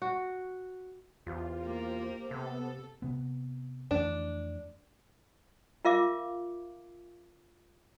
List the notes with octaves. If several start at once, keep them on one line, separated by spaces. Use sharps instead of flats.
F#4
E2 F4 G4 C5
A#3 A#4
C3 B3 A4
C3 B3
F2 E3 A3 D4
F4 A#4 E5 F5 D6